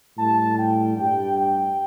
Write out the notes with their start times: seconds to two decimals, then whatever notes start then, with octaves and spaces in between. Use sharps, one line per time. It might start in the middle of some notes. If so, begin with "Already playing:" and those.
0.17 A2 G3 A5
0.57 G5
0.97 G2 G3 G5
1.37 G5